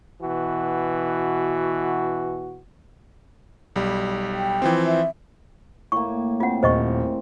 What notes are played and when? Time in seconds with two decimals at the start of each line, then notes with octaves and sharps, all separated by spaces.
0.22 B2 E3 F#4
3.76 B1 G3
4.35 G5
4.62 E3 F3 C4
4.86 E5
5.92 A2 A#3 C#6
6.40 C3 C4 F4 F#5
6.63 D#1 C5 D#5 C#6